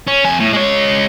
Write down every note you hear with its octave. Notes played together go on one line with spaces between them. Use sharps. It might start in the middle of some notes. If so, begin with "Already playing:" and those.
C#4
F2 G#5
A2
G#3 C#5